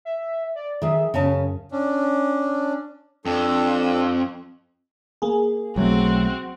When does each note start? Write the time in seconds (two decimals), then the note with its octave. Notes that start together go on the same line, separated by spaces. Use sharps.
0.05 E5
0.55 D5
0.82 D#3 G#4 E5
1.14 F#2 C#3 C#4 A5
1.72 C#4 D4
3.25 F2 D4 A4 E6
5.22 A#3 G#4
5.76 B1 F#3 A3 C4 F#4